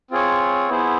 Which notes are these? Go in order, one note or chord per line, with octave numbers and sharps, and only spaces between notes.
C4 F4 G#4 C#5
B3 E4 G#4 C5